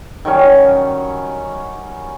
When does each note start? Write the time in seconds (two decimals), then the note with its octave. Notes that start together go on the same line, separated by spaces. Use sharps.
0.25 D#3 F#3 G3 C#4